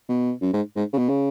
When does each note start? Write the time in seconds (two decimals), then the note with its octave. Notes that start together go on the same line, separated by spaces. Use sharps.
0.09 B2
0.42 F#2
0.54 G#2
0.76 G#2
0.93 C#3
0.98 B2
1.09 C#3